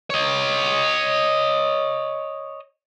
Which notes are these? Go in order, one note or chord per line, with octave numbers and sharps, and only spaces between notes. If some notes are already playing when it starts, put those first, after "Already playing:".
C#5 D#5